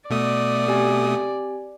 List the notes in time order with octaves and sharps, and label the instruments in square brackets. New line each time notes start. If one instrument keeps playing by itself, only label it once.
[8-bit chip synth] B2 A3 D#6 [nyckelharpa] D5
[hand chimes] C4 G4 G#5